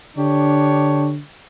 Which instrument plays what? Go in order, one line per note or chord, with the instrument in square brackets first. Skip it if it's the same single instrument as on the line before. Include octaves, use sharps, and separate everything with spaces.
[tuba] D3 [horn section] D4 G4 C#5